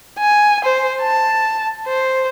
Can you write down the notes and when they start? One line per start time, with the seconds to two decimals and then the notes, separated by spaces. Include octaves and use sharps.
0.19 G#5
0.64 C5
1.01 A5
1.88 C5